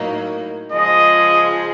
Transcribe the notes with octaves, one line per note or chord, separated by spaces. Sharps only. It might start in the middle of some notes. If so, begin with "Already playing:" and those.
Already playing: A2 F#3 A#3 D#4
C#3 F3 G#3 D#5